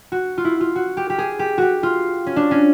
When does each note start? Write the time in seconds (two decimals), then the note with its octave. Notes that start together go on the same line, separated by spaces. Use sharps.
0.12 F#4
0.38 F4
0.45 E4
0.61 F4
0.76 F#4
0.97 G4
1.10 G4
1.18 G#4
1.39 G4
1.58 F#4 G4
1.83 F4
2.26 C#4
2.36 D4
2.51 C#4